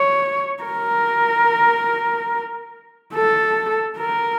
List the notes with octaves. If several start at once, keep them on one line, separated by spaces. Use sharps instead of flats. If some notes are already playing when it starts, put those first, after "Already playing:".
Already playing: C#5
A#4
A4
A#4